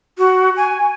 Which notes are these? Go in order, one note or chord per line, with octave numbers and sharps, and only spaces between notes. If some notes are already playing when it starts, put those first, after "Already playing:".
F#4
G#5